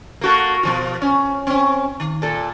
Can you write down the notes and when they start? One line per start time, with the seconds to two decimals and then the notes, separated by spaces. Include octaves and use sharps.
0.21 A#3 F#4 A4
0.63 B2 F3 F4
1.02 C#4
1.47 C4 C#4
2.00 D#3
2.22 A#2 A4